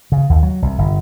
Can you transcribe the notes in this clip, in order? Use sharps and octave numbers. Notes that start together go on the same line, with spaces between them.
C#3
D#2
F#3
C2
G1